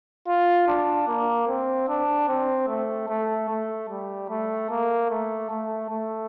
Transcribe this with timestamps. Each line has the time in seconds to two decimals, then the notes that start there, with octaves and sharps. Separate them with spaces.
0.27 F4
0.68 D4
1.08 A#3
1.48 C4
1.88 D4
2.28 C4
2.68 A3
3.09 A3
3.49 A3
3.89 G3
4.29 A3
4.70 A#3
5.10 A3
5.49 A3
5.90 A3